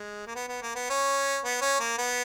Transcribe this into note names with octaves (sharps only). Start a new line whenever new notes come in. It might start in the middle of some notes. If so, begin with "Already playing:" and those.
Already playing: G#3
A#3
B3
B3
A#3
B3
C#4
B3
C#4
A#3
B3